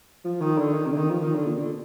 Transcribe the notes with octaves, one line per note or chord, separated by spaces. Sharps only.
F3
D#3
D3
D#3
C3
D3
D#3
F3
D#3
D3
A#2
D3